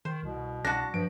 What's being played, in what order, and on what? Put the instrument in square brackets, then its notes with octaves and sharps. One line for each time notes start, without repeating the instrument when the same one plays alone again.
[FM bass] D#3 [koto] C5
[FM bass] C2 [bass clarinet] B2
[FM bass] C2 [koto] D4 F#4 [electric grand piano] A5 A#6
[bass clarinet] G2 [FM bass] F3 [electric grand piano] D7